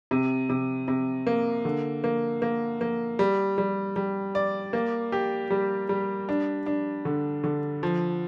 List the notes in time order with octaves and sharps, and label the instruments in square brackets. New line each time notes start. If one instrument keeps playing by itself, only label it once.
[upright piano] C3
C3
C3
A#3
D3
A#3
A#3
A#3
G3
G3
G3
D5
A#3
G4
G3
G3
D4
D4
D3
D3
F3